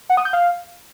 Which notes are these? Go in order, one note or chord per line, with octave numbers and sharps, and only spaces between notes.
F#5
D#6
G6
F5